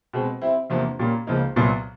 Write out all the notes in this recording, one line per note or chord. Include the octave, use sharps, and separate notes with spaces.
B2 G#3 C4
G3 C4 E4
E2 C3 F3 A#3 D4
A#2 G3 A#3 C#4
C#2 C#3 F3 A#3 D#4
C2 A#2 F#3 B3